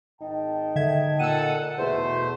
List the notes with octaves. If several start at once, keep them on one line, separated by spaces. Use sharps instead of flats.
G#1 D#4 G5 A5
D3 E5 G#6
A#2 A4 F#5 A5 E6 D#7
E2 B2 A3 C5